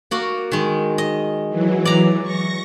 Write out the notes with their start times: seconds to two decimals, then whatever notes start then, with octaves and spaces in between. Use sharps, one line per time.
0.11 A#3 F#4 D5
0.52 D#3 G#3
0.98 D#5
1.49 E3 F#3
1.85 D5 A#5
2.23 C#6 A#6